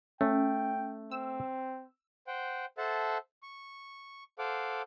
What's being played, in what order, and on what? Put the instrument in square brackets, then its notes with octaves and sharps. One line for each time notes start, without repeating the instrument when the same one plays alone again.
[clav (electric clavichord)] A3 [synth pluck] C#4 [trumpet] G5
[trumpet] C4 [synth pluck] E6
[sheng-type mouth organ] C5 F#5 G5
A4 C5 E5 F#5 A5
C#6
A4 C5 F5 F#5 D6